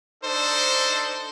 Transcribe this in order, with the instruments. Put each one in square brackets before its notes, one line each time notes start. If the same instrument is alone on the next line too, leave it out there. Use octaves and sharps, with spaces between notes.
[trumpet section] D4 D#4 A4 C5